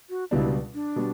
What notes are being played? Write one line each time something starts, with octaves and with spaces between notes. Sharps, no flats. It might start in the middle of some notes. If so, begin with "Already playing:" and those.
F#4
C#2 B2 G3 D4 E4
D4
B2 G3